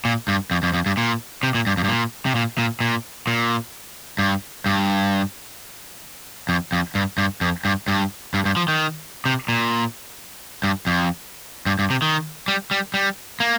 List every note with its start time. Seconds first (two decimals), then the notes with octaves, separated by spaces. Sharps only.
0.05 A#2
0.28 G2
0.51 F2
0.63 F2
0.74 F2
0.86 G2
0.97 A#2
1.43 C3
1.54 A#2
1.67 G2
1.77 F2
1.84 G2
1.88 A#2
2.26 C3
2.35 A#2
2.58 A#2
2.80 A#2
3.27 A#2
4.19 G2
4.66 G2
6.49 F2
6.72 F2
6.95 G2
7.18 G2
7.41 F2
7.65 G2
7.88 G2
8.34 G2
8.45 G2
8.57 F3
8.68 D#3
9.25 C3
9.49 A#2
10.64 G2
10.87 F2
11.66 G2
11.79 G2
11.90 C3
12.02 D#3
12.48 G3
12.71 G3
12.94 G3
13.40 A#3